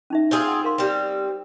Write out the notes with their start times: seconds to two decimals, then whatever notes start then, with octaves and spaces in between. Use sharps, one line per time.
0.10 C#4 D#4 E5
0.31 C4 F4 G#4
0.48 F#5 G#5
0.64 A#4 F5 C6
0.78 G3 C4